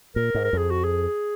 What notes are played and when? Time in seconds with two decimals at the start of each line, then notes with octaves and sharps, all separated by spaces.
0.16 A#2 A#4
0.35 G#2
0.44 A#4
0.53 F2 G#4
0.71 F#4
0.84 G#4